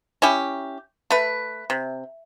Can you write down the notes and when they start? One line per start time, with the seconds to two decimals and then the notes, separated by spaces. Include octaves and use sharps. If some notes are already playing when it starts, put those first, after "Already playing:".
0.22 C#4 E4 G4
1.10 A3 B4
1.70 C3